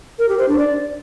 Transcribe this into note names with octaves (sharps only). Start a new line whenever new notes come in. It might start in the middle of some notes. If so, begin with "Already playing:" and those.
A#4
G4
C5
D4
D5